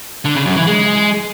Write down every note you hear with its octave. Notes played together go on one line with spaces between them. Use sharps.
D3
C#3
F#2
E3
G#3